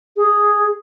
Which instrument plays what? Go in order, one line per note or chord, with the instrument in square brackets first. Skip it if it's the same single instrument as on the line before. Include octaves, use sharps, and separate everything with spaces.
[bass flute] G#4